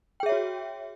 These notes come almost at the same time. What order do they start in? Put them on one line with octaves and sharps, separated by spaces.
G5 G#4 E5 C#5 F#4